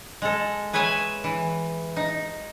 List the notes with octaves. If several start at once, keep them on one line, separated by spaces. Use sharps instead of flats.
G#3 A4
G#4 B4 C#5 E5 G#5
E3
D#4